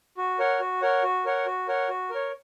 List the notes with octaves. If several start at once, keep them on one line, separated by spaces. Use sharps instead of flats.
F#4
A#4 C#5 F#5
F#4
A#4 C#5 F#5
F#4
A#4 C#5 F#5
F#4
A#4 C#5 F#5
F#4
A#4 C#5